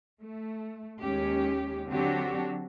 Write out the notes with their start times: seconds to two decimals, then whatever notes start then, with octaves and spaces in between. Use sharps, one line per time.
0.20 A3
1.01 D#2 G#3 C#4 G4
1.91 D3 F#3 C4 D4 F#4 G4